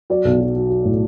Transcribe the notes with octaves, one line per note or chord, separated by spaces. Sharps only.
F#3 D5
B1
F#3
F#3
F#3
A2